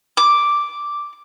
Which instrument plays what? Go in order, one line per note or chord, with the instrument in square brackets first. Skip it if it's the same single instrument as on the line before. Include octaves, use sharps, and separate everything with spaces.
[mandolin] D6